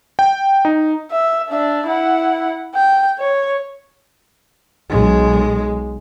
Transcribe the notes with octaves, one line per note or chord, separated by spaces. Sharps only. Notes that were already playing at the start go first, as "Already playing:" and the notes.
G5
D#4
E5
D4 E5
E4 F#5
G5
C#5
B1 G#3